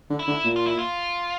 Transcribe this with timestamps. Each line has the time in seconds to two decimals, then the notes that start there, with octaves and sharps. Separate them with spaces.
0.10 D3
0.19 E4
0.27 D3
0.44 A#2
0.56 F4
0.67 E4
0.79 F4